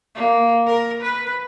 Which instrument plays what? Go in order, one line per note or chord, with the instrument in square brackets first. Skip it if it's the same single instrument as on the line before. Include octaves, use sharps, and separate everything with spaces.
[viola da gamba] A#3
A#4
B4